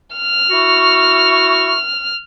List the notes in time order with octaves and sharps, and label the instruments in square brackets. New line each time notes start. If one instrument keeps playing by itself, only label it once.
[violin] F6
[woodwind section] E4 F#4 C#6